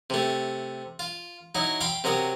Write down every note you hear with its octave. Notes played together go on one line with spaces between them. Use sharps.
C3 A3
F4
F#3 D#4 E4
F5 G5 B5 C6
C3 F#3 A#4 D#6